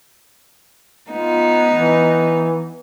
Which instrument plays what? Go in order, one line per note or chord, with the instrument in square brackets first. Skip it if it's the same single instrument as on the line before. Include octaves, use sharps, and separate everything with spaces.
[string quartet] B3 D#4 [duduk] F4
[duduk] E3